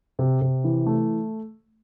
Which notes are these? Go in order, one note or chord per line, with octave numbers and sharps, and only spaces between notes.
C3
C3
E3
A3